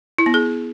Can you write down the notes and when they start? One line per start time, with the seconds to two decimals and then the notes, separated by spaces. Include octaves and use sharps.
0.18 E4
0.26 B3
0.34 G#4